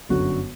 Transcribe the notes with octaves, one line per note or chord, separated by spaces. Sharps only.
G1 F#2 D3 F#3 F#4